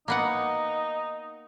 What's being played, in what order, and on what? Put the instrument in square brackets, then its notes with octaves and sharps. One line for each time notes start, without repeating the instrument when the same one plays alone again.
[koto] A#3 B3 F#5 [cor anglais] D#4